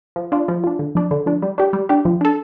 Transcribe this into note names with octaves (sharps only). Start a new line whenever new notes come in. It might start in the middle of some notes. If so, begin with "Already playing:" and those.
F3
D4 F4
F3
D4 F4
D3
F3 D4
D3
F3 D4
G3
D4 G4
G3
D4 G4
F3
D4 A4